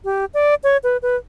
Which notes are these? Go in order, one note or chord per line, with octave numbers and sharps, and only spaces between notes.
G4
D5
C#5
B4
B4